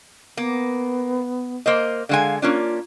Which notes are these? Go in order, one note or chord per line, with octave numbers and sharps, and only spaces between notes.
A#3 B3
A#3 C5 D#5
D3 G#3 F5 G#5
A#3 C#4 D4 F4